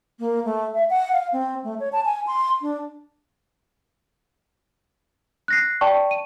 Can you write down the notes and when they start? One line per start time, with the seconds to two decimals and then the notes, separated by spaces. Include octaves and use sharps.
0.19 A#3
0.45 A3
0.74 E5
0.90 F#5
1.13 F5
1.33 C4
1.64 A3
1.80 C#5
1.93 A5
2.05 G#5
2.27 C6
2.61 D4
5.48 F#6 A#6 C7
5.81 D5 G5 A5 C#6
6.11 D#7